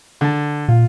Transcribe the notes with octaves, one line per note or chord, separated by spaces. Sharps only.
D3 A5
A#2 F4